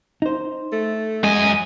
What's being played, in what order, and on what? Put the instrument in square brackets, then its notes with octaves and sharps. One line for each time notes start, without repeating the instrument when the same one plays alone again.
[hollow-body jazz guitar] D#4 C5
[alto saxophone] A3
[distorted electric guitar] F#2 G#5 [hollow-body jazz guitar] G#3 [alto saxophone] D#5